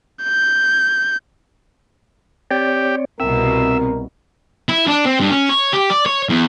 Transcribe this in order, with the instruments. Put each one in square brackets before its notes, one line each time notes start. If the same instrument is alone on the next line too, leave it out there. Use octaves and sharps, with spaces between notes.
[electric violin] G6
[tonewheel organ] C4 C#5 D5 [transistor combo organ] G4
[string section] C2 B2 [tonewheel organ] C4 [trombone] A#4 [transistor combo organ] E5
[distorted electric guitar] E4
D4
C4
G2
C#4
C#5
G4
D5
C#5
E2